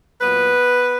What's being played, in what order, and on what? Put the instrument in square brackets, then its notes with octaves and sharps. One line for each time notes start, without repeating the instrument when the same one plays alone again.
[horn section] A#2 F#3 B3 B4